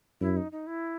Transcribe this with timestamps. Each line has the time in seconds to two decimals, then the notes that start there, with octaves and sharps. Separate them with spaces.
0.21 F#2 E4
0.37 D#4
0.52 D#4
0.67 E4